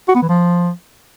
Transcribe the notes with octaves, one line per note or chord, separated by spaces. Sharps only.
F#4
B3
E3
F3